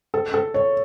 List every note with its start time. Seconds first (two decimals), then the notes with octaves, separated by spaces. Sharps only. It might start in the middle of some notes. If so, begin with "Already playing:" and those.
0.14 A4
0.34 A4
0.54 C#5